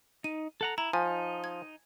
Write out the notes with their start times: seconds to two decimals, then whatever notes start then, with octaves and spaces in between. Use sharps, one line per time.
0.24 D#4 D#7
0.61 A4 F#5 A#5
0.78 E4 A#5
0.93 F3 D#4 G#5
1.44 G#6